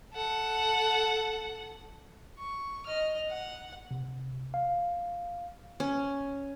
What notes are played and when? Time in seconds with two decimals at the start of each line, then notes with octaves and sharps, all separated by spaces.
0.13 A4 F#5
2.39 C#6
2.86 D#5 F6
3.29 F#5
3.91 C3
4.54 F5
5.80 C#4